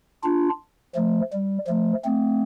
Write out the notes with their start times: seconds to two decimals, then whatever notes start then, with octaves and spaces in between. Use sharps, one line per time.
0.23 D4 F4
0.95 F3 A3
1.33 G3
1.68 F3 A3
2.04 A3 C4